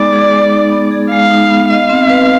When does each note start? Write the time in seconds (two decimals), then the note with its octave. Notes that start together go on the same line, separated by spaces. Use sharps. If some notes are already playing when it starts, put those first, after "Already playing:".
Already playing: G#3 B3 D#4 G#4 D5
0.13 G#4
0.33 G#3
0.52 D#4
0.71 B3
0.91 G#4
1.11 G#3 F5
1.30 D#4
1.50 B3
1.70 D#5 F5
1.90 C4
2.10 B4